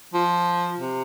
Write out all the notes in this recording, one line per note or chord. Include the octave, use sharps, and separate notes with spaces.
F3
C3